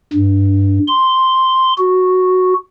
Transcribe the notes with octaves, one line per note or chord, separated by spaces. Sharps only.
G2
C6
F#4